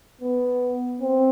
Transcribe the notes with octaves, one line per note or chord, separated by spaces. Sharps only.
B3
C4